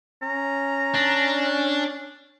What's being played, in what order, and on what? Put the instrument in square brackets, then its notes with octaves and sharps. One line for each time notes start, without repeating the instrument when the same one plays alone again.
[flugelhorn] C#4 [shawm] A#5
[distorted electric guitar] D4